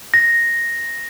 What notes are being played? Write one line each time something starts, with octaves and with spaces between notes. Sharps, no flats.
A#6